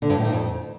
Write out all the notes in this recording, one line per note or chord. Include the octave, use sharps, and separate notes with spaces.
D3
G2
A2
D#3
F2